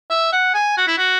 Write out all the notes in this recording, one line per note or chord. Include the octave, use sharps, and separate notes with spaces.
E5
F#5
G#5
F#4
E4
F#4